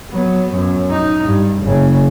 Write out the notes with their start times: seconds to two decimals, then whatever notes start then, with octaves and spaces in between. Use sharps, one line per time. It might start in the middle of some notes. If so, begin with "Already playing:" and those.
0.11 F#3 B3
0.51 F#2
0.91 D#4
1.23 G2
1.62 F#1 C#3